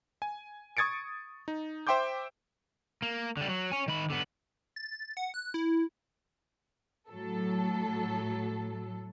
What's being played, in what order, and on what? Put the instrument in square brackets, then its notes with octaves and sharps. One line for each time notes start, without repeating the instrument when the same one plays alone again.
[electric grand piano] G#5
C#6 D#6 G#6 A6 C#7 D7
D#4
C5 E5 G5 C6 D6 G6
[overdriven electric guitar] A#3
D3 G3
F#3
C#5 G#5
D#3 B5
D3 B3
[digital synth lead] A6
F#5
F#6
E4
[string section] A2 F#3 A4